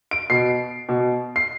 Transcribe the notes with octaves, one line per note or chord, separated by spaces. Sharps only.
D7
B2 C7
B2
C7